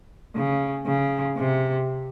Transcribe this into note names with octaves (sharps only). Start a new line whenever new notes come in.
C#3
C#3
C3